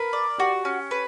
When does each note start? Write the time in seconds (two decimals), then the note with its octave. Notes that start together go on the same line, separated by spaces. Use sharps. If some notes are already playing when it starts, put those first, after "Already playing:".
Already playing: A#4 B4
0.13 D5
0.38 F#4 G4
0.65 C#4
0.91 B4